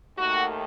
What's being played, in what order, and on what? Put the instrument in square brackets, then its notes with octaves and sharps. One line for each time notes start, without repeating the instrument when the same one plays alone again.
[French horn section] D#2 D#3 A3 F#4